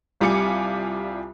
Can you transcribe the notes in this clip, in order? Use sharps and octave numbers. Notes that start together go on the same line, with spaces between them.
C2 G3 F4 G#5 D6 C#7